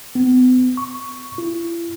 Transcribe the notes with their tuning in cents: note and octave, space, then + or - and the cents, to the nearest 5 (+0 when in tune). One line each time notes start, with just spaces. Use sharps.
B3 +40
C#6 +5
E4 +40